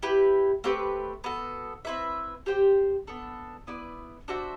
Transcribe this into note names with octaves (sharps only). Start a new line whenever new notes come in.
E4 G4 B4
A3 C4 G4 B4
B3 F#4 A4
C4 E4 B4 E5
G4 C5 G5
B3 D4 A4
B3 E4 B4 D5
D4 F#4 C5 E5